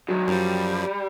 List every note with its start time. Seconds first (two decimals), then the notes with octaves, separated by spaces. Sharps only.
0.08 G2 D#3 F#3
0.28 F#2 F3 G3